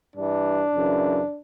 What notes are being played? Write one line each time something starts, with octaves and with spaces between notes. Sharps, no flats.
G2 E3 D4
F#2 C#3 E3